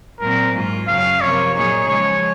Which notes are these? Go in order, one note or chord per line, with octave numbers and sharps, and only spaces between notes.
A#2 F#3 C4 A#4
G#2 F#3 A#3 F4
F#2 C#3 F#3 F5
C3 F3 A#3 C#5
A#2 F#3 A#3 D#4 G#4 C#5
C#3 F3 G#3 C#5